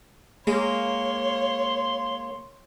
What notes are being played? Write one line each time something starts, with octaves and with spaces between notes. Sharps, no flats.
G#3 A#3 C#5 C6